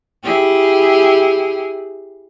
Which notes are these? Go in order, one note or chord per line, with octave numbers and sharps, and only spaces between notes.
E4 G4 G#4